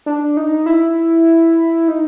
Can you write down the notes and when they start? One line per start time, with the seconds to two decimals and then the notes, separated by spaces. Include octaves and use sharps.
0.06 D4
0.37 D#4
0.66 E4
1.88 D#4